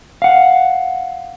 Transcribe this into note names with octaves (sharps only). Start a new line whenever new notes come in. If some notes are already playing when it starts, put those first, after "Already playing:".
F5 F#5